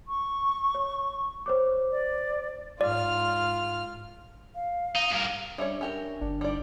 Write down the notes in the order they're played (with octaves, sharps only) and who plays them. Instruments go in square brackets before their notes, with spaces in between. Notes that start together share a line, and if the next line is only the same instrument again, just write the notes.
[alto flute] C#6
[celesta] C#5
C5 C#5 D6
[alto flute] D5
[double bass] G#2 [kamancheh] F4 F6 [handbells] D5
[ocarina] F5
[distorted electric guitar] D#4
G2 A#4
[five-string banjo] G3 C#4 C#5 [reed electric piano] D4 E5
[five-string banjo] C#4 G4 A#4
[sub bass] G1 [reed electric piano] D4
[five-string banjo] G3 D5 [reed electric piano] D4 D#4